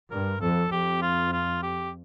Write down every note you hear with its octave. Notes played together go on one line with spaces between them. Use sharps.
G2 A#4
F2 A4
F2 G4
F4
F4
G4